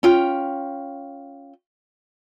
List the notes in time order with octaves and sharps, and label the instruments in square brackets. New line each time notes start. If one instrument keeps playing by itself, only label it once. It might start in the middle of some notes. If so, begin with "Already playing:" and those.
[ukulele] C#4 F4 G5